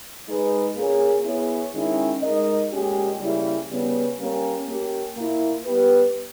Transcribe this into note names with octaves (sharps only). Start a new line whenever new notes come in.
G#3 D#4 G#4 B4 D#5
A#2 A#3 C#4 G#4 C#5
B3 E4 G#4 C#5
D#3 G#3 C#4 E4
G#3 D#4 A#4 D#5
A#2 G#3 C#4 G4
C#3 G3 A#3 E4 G#4
C#3 G3 B3
G3 A#3 C#4
A#3 C#4 G4
A#2 A#3 E4
G3 B3 G4 B4